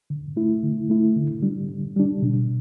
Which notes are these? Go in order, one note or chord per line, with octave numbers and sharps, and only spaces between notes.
D3
A3 E4
D3
A3 E4
D3
G3 D4
D3
G3 D4
B2